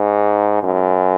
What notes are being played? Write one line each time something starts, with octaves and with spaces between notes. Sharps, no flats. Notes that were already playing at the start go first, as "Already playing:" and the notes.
Already playing: G#2
F#2